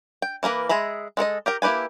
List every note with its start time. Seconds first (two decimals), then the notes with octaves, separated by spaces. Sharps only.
0.22 G5
0.43 E3 A#3 A#4 B4
0.69 G#3 G#4 E5 A#5 B5
1.17 G#3 A4 A#4 D#5
1.46 G4 A#4 G5
1.62 A#3 E4 G4 B4 G#5